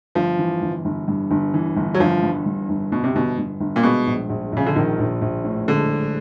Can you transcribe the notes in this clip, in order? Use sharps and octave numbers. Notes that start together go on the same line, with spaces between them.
G1 F3
E3
G1
G1
G2
G1
E3
G1
F#3
G1 F3
G2
G2
G1
G1 B2
C3
G1 B2
G1
G1
A#2
B2 G#3
A#1
A#1
A#1 C#3
D3
A#1 D#3
A#1
A#1
A2
D3 G#3
G#3